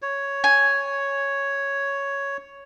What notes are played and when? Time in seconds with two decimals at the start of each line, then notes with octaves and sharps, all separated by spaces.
0.02 C#5
0.44 G#5